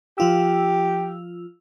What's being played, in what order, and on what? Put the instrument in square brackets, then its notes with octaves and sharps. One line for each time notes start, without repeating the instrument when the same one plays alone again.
[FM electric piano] F3 F4 E6 [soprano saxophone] G4